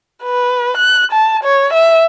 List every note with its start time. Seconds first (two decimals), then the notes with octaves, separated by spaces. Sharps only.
0.23 B4
0.77 F#6
1.12 A5
1.43 C#5
1.73 E5